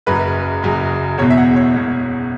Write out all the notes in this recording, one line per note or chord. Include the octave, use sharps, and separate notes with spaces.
F#1 F#2 C#3 F#3 B4
F#1 F#2 C#3 F#3
E1 E2 B2 C#5
E5
F#5
C#5
E1 E2 B2